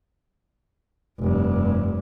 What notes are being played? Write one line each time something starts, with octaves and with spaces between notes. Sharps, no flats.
F1 G2